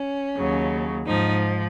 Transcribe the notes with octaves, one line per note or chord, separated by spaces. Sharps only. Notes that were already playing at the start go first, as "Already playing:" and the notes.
Already playing: C#4
D#2 C#3 F#3
G#2 F3 D#4